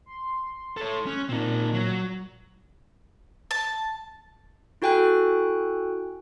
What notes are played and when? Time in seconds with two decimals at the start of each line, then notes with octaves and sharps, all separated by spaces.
0.06 C6
0.77 A4 C#5
1.06 C#4 F#6
1.29 A#2 C4 D#4
1.73 F#3
3.51 A5
4.82 E4 F#4 A4 G5 G#5 F#6